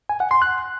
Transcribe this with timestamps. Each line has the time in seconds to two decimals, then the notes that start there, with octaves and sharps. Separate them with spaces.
0.09 G#5
0.20 F#5
0.31 C6
0.42 F#6